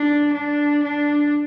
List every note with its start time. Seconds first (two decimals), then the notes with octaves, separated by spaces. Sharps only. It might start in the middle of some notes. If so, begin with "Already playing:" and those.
Already playing: D4
0.33 D4
0.84 D4